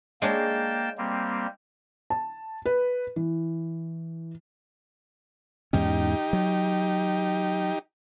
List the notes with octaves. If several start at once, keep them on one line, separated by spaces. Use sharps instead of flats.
G#3 A#3 D4 C#5 G5 A5
G3 A#3 C4
A5
B4
E3
E2 G#2 C#4 D#4 G4
F#3